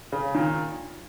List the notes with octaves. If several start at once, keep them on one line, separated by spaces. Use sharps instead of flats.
C#3
A#2 D#3